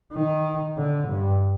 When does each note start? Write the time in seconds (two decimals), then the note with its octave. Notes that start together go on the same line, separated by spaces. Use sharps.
0.13 D#3
0.77 D3
1.08 G2